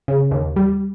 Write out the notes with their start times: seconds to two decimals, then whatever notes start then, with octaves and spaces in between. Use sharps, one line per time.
0.08 C#3
0.31 D#2
0.56 G3